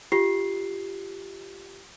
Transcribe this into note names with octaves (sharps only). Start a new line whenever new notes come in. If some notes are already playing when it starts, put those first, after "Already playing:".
F4 G4 C7